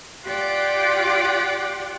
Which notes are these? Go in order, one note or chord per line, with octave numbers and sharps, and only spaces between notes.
F4 G4 D5 F#5 G5 D6